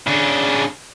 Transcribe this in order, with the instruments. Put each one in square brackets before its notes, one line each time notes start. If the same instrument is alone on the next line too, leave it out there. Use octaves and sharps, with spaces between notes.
[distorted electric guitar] C#3 D4